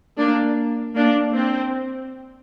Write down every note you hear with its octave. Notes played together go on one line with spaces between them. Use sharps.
A#3 D4
A#3 D4
C4